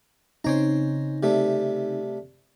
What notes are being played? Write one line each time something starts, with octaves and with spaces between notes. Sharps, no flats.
C#3 C4 D#4 C5 C#5 A#5
C3 G3 A3